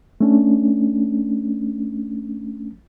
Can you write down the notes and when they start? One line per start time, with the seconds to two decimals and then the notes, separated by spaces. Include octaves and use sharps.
0.21 A3 C#4 D4